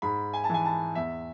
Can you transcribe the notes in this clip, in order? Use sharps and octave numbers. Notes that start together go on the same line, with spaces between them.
G#2 B5
G#5
A5
E3 G#5
A5
E2 E5